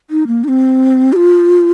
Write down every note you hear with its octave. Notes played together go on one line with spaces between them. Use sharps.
D#4
A#3
D#4
C4
G4
F4